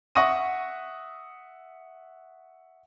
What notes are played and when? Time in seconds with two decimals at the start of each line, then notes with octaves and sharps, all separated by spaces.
0.15 E5 F#5 C#6 D#6 A#6 D#7